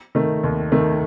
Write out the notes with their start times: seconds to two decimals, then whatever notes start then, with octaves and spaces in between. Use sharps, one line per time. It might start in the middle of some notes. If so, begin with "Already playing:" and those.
0.15 D#3 A3
0.43 D#2
0.72 D#3 A3